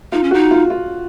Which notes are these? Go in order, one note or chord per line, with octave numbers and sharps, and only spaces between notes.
D#4 F4
C#4
D#4 F#4
F4
F4